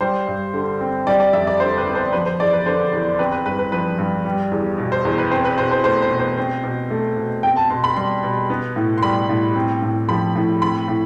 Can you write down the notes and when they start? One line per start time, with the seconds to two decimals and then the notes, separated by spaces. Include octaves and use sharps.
0.01 G3 C5
0.27 G2
0.54 D3
0.81 C4
1.07 G3 D5
1.20 D5
1.33 F2 E5
1.47 D5
1.60 D3 C5
1.78 B4
1.87 B3
1.95 C5
2.13 F3 B4
2.26 C5
2.40 E2 D5
2.53 B4
2.66 D3 C5
2.93 E2
3.19 C4 B4
3.32 B4
3.46 G2 B4
3.59 B4
3.72 F3 B4
3.98 G2
4.25 G3
4.52 E2
4.78 B2
4.92 C5
5.05 E2
5.18 B4
5.31 C4 C5
5.45 B4
5.58 B2 C5
5.71 C5
5.84 A3 C5
6.02 C5
6.11 B2
6.19 C5
6.37 C4 C5
6.64 B2
6.91 A3
7.17 B2
7.43 C4 G5
7.56 A5
7.70 B2 C6
7.84 B5
7.96 G3 C6
8.23 B2
8.50 B3
8.76 A2
8.98 C6
9.03 G3 B5
9.29 A2
9.56 C4
9.82 A2
10.09 F3 B5
10.36 A2
10.62 C4 B5
10.88 A2